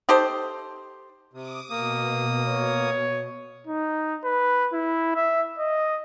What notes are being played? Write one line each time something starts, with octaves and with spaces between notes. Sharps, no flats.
D#4 G4 A4 C5
C3 D6 D#6
B2 A#3 D#6
C#5
D#4
B4
E4
E5
D#5